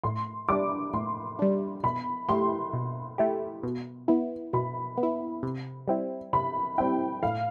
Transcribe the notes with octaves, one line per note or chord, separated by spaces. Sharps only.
A2 C6
G3 D4 D6
A2 C6
G3 D4
B2 B5
A3 E4 G4 C6
B2
A3 E4 G4
B2
B3 E4
B2 B5
B3
E4
C3
G3 C4 E4
C3 B5
G3 C4 E4 G5
A2 F5